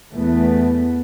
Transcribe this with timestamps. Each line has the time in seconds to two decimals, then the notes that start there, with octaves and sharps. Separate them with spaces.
0.15 E2 A3 B3